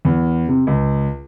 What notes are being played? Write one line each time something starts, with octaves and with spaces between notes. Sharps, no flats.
E2
C3
C#2